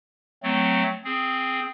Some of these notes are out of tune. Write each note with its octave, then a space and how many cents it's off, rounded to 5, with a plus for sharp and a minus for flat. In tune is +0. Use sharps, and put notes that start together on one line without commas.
F#3 +0 A3 +10 C4 -20
C4 +0 G#4 +0